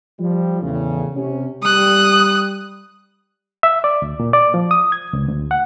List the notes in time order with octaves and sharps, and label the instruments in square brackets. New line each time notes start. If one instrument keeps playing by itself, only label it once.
[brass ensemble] F3 G3
E2 A2 C#3
C3 C#4
[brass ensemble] G3 [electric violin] D#6 F#6
[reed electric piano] E5
D5
D2
A#2
D5
F3
D#6
G#6
C#2
D2
F#5